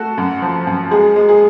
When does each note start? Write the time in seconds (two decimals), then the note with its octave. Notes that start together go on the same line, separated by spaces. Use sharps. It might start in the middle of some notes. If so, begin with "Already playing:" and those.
Already playing: A3 F#4 A4
0.18 F#2
0.42 F3
0.67 F#2
0.91 G#3 G#4
1.16 G#3
1.29 G#4